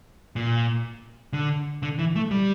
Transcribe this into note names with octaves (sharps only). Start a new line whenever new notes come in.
A#2
D3
D3
E3
A3
G3